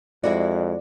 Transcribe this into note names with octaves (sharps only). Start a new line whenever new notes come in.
F2 G#3 E4 F#4 D5